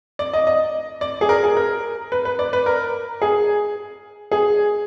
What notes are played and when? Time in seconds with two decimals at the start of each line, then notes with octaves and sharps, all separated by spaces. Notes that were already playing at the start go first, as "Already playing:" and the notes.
0.19 D5
0.33 D#5
0.47 D#5
1.01 D5
1.21 G#4
1.29 A#4
1.44 G#4
1.57 A#4
2.12 B4
2.25 B4
2.39 D5
2.53 B4
2.66 A#4
3.22 G#4
4.31 G#4